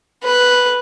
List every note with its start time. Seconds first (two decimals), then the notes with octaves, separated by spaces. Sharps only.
0.24 B4